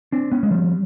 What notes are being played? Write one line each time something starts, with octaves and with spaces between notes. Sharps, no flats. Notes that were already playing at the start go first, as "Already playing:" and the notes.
C4 D4
B3 C#4
G#3
F3 G3